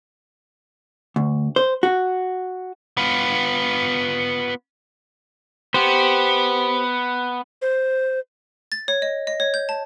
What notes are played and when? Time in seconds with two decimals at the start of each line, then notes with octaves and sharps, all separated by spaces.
1.16 D2
1.56 C5
1.83 F#4
2.97 B3 F4
5.74 B3 G4 C5
7.62 C5
8.72 A6
8.88 C#5
9.02 D#5
9.27 D#5
9.40 C#5
9.54 G6
9.69 A5